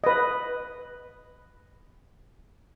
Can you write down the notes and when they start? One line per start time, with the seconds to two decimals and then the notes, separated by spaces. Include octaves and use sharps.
0.04 B4 D#5